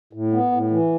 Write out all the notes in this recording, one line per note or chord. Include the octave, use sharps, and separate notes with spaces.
A2
B3
A2
E3